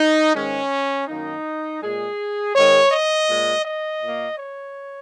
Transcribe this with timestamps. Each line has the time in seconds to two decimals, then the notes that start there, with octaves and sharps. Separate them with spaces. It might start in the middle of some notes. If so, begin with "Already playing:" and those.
Already playing: D#4
0.34 G#2 D#3 G#3 C#4
1.07 F#2 D#3 A#3 D#4
1.81 A#2 G#3 G#4
2.55 G#2 D#3 G#3 C#5
2.91 D#5
3.28 A#2 G#3
3.64 D#5
4.01 A#2 A#3
4.38 C#5